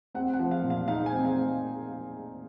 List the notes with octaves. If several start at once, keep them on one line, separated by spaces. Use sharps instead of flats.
C4 F#5
F#5
F3
F5
A#2
F5
D#4 F5
G#5
C4
F5